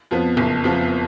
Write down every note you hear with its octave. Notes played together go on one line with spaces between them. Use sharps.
F2 F3 B3
F#1
F2 F3 B3